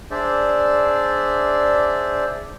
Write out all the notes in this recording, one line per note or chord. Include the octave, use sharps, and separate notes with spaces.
D4 G#4 C5 D5 E5